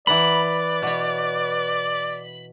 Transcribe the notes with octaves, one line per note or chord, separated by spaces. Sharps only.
E3 B4 D5 F#5 A#5 B5
B2 C#5